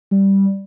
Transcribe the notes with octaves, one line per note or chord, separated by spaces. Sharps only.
G3